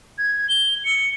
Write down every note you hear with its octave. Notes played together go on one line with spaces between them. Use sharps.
G#6
G7
C#7